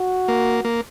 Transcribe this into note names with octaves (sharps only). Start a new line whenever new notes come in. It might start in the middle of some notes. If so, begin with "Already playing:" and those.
Already playing: F#4
A#3
A#3